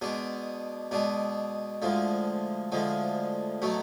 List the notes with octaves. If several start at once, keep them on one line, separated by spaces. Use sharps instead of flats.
B2 G#3 D4
B2 G#3 D4
D2 D3 F3 G#3
D2 D3 F3 G#3
B2 F#3 A3